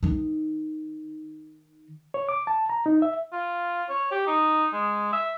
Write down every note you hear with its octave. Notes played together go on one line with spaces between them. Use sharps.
D#3 D#4
C#5
D6
A5
A#5
D#4
E5
F4
C#5
G4
D#4
G#3
E5